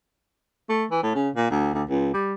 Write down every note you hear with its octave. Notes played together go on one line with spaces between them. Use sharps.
A3
E3
A2
C#3
A#2
D2
D2
C#2
G3